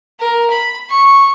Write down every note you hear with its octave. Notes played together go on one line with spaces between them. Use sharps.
A#4
B5
C#6